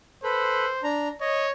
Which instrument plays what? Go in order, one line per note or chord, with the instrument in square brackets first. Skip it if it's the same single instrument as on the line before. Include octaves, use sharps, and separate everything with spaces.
[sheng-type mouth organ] A4 B4 [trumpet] C5
[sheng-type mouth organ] D4 A#5
[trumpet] C#5 [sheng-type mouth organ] D#5